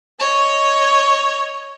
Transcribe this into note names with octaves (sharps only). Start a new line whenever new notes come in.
C#5 D#5